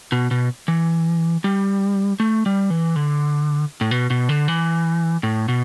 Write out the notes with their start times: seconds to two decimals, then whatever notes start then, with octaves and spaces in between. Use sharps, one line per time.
0.12 B2
0.31 B2
0.68 E3
1.44 G3
2.20 A3
2.46 G3
2.70 E3
2.96 D3
3.81 A2
3.91 B2
4.10 B2
4.29 D3
4.48 E3
5.23 A2
5.48 B2